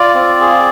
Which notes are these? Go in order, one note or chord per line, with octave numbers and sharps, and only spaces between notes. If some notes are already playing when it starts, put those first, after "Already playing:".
Already playing: F4 D5
C4
G#4